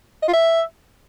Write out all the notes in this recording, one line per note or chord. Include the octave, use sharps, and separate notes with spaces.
D#5
F4
E5